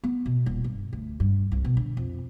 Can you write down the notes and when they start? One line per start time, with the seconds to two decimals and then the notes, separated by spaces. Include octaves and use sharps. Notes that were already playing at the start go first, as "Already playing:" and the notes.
0.04 B3
0.26 B2
0.46 D#1
0.64 G2
0.93 D2
1.20 G2
1.52 C2
1.65 B2
1.77 D3
1.97 F2